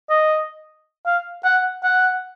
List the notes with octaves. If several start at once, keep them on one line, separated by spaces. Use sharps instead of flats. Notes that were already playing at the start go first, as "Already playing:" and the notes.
D#5
F5
F#5
F#5